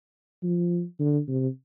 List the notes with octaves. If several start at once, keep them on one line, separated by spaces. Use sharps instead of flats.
F3
D3
C3